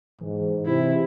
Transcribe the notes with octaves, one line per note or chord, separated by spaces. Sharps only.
G#2 E3
C3 E4